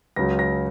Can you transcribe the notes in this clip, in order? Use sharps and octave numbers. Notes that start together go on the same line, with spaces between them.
C#2 C#3 F#3 A#6
A#6